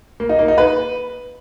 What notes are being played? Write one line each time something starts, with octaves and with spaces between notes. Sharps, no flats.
A#3
D#4
A#3
D#4
B4